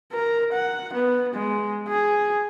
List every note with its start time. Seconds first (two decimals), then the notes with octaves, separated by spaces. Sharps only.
0.13 A#4
0.52 F#5
0.94 B3
1.34 G#3
1.88 G#4